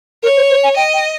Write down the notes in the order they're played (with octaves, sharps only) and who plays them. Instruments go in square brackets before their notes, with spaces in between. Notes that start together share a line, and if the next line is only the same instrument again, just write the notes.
[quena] A#4 [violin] C#5
[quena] C5
C5
G#5
[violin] D#5 [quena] G5
[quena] G5